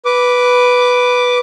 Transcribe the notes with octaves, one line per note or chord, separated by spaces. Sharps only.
B4 D6